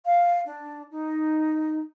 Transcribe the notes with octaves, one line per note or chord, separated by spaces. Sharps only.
F5
D4
D#4